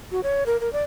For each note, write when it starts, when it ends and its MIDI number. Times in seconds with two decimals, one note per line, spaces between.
0.12 0.21 66
0.23 0.44 73
0.46 0.57 70
0.61 0.71 70
0.73 0.83 74